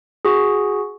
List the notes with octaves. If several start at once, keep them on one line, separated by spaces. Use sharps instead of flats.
F#4 G#4